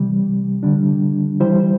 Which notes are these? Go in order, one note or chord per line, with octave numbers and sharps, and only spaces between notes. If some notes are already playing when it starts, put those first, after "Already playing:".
Already playing: C3 E3 G3
D3 G3 D4
E3 G3 E4 C5